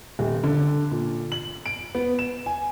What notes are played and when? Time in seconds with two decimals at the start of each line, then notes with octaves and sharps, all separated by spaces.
0.19 D#1
0.44 D3
0.91 A#2
1.32 F#7
1.66 D7
1.95 B3
2.19 E7
2.46 G#5